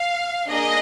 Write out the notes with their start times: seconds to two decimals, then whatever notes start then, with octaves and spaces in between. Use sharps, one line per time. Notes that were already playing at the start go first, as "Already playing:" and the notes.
Already playing: F5
0.48 A#3 D4 G#4 D#5